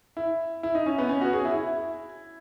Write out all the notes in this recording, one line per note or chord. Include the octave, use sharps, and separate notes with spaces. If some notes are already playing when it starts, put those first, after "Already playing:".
E4
E4
D#4
C#4
B3
C#4
F#4
G#4
E4
E4